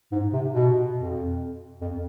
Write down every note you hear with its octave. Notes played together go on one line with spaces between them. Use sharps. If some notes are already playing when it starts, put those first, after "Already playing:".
G#2
C3
B2
F2
F2